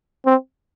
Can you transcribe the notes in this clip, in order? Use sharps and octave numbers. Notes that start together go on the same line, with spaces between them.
C4